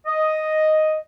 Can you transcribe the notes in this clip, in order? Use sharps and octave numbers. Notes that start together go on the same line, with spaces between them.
D#5